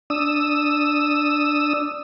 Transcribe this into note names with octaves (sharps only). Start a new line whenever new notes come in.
D4 D#6 E6